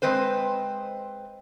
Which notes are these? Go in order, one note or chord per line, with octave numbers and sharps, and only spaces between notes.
G#3 C4 B4 C5